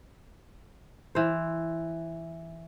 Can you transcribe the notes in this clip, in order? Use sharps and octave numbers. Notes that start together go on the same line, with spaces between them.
E3 C5